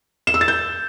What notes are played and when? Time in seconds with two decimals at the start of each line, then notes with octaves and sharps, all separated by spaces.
0.27 E7
0.34 E6
0.41 A6
0.48 G6